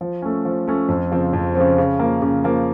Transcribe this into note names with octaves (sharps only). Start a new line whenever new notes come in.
F3
A3 C#4
F3
A3 C#4
F2
C#3 F3 C4
F2
C#3 F3 C4
C#3
F3 A#3
C#3
F3 A#3